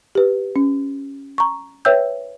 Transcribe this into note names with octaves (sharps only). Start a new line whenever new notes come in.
G4 B4
C#4
A#5 C#6
B4 C#5 E5 G5 E6 G6